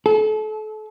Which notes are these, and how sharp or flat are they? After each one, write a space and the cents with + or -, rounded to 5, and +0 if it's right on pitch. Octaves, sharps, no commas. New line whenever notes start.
A4 -35